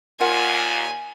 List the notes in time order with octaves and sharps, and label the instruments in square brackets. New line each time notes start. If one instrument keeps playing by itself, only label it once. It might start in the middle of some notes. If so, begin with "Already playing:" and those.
[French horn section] D#2 A#2 [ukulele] F4 A#4 F#5 [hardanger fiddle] G#5